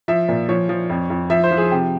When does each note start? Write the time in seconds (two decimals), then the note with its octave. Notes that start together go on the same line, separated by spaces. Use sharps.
0.08 F3 E5
0.29 A#2
0.49 F3 C#5
0.69 F3
0.90 F2
1.10 F2
1.30 F3 E5
1.44 C5
1.51 F3
1.57 G#4
1.71 C3 G4